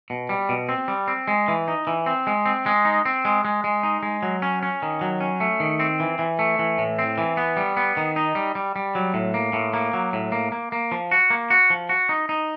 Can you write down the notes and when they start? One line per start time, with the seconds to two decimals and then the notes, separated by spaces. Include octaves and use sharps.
0.10 B2
0.29 G3
0.49 B2
0.69 C4
0.88 G3
1.08 C4
1.28 G#3
1.48 E3
1.68 D#4
1.87 E3
2.06 C4
2.27 G#3
2.46 C4
2.66 G#3
2.85 D#4
3.05 C4
3.25 G#3
3.45 G#3
3.64 G#3
3.83 D#4
4.03 G#3
4.23 F#3
4.42 C#4
4.63 C#4
4.82 D#3
5.01 F#3
5.21 C#4
5.40 A3
5.60 D#3
5.80 C4
6.00 E3
6.19 E3
6.39 A3
6.59 E3
6.78 A2
6.99 C4
7.18 E3
7.37 B3
7.57 G3
7.77 B3
7.97 D#3
8.16 D#4
8.35 G3
8.55 G3
8.76 G3
8.95 F#3
9.14 A2
9.34 A#3
9.53 A2
9.74 A#3
9.94 F#3
10.13 A2
10.32 A#3
10.52 A#3
10.72 A#3
10.92 F3
11.11 F#4
11.30 A#3
11.50 F#4
11.70 F3
11.89 F#4
12.09 D#4
12.29 D#4